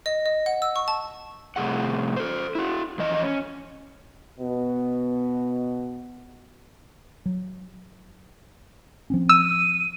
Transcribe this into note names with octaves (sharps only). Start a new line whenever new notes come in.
D#5
D#5
F#5
E6
C#6
A5
F2 A2 C3 G#4 F#5
A4 C5
E4 F#4
F2 E3 D#5
C#4
B2 B3 F#4
F#3
F3 C4 C#4
E6 D#7